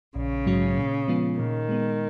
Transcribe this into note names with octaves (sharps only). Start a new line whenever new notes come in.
A#1 C#3
G#2 F#3 C#4 F#4
A#2
F3 G#3 B3 F4
A#2 D#3
G#3 B3